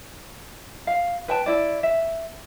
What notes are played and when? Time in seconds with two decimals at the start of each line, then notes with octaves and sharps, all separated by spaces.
0.87 F5
1.28 B4 G5 A5
1.46 E4 D5
1.83 E5